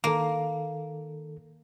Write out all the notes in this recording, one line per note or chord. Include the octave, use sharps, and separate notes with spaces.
D#3 A#3 A4